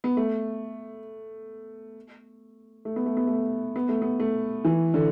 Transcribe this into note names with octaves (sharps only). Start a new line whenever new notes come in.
B3
A3
A3
B3
A3
B3
A3
B3
A3
B3
A3
E3
D3